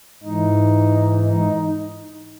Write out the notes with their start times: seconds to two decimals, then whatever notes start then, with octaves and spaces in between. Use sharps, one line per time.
0.23 G#2 E3 D#4
1.25 D#4